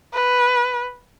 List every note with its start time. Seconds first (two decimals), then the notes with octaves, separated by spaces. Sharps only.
0.14 B4